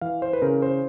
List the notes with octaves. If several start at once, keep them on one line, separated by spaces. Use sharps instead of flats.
E3 F5
C5
B4
C#3 A#4
C5